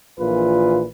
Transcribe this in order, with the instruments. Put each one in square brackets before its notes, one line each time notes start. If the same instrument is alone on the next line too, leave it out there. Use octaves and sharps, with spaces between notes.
[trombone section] A#1 A#2 E3 F4 B4